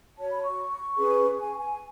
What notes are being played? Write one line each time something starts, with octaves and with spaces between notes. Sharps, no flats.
F#4 C#5 A5
B5
C#6
C#4 G#4 B4
G#5
G#5